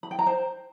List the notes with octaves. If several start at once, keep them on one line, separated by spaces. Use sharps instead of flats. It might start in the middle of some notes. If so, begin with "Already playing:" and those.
B5
G5
A#5
C5